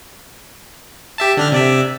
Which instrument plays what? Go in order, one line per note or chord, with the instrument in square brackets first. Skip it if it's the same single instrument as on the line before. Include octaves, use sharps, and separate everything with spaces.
[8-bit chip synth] G4 E5 A5
D3 D4 F6
C3 D5 E5